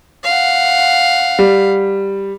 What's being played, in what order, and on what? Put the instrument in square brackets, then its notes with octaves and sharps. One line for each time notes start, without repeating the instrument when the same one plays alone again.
[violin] F5 F#5
[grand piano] G3